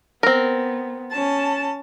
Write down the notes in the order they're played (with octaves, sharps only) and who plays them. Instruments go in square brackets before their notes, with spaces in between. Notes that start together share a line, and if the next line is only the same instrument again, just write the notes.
[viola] B3 [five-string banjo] C4 A#4
[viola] C#4 A5